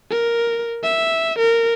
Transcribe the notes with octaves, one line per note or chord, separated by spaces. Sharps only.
A#4
E5
A#4